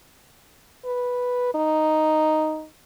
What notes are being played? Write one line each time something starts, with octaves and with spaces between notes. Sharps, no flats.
B4
D#4